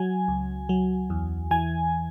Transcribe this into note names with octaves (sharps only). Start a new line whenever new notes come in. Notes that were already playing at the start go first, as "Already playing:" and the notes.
Already playing: F#3 G#5
C#2
F#3
E2
E3 G#5